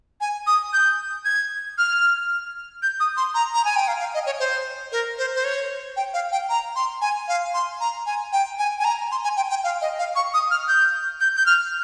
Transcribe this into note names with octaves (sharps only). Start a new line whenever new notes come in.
G#5
D#6
G6
G#6
F6
G6
D#6
C6
A#5
A#5
G#5
G5
F5
F5
D#5
C#5
C5
A#4
C5
C5
C#5
G5
F5
G5
A#5
C6
G#5
F5
C6
A#5
G#5
G5
G#5
G#5
A#5
C6
G#5
G5
G5
F5
D#5
F5
C#6
D#6
F6
G6
G6
G6
F6